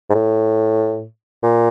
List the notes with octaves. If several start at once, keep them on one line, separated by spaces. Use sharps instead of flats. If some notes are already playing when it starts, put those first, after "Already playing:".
G#2
A2
A#2